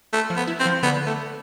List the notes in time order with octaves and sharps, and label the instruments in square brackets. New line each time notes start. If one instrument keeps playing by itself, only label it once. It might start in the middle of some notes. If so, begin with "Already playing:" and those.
[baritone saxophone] A3
[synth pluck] F3
[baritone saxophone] B3
[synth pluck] E4
[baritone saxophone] C4
[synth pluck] F3
[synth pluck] D3 [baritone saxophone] B3
[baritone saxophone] A3